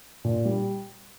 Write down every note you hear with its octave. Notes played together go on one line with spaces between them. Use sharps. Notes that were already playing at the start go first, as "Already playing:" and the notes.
A#2
G3